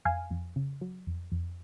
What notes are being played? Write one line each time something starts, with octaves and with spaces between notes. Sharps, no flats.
F2 F5 G#5
F2
C#3
F#3
F2
F2